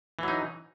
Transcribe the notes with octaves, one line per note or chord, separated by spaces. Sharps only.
E3 F#3 D#4